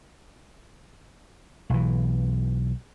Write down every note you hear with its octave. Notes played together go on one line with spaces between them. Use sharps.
B1 E3